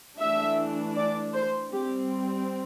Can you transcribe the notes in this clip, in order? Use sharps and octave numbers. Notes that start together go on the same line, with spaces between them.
E3 A3 D4 E5
D5
C5
G3 C4 G4